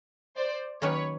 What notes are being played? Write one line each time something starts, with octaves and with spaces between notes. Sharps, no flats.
C5 D5
D#3 F#3 A#3 C#4 B4 C#5